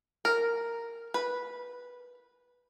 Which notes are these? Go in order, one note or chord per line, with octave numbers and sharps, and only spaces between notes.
A#4
B4